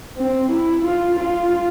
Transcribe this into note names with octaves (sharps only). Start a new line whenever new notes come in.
C4
E4
F4
F4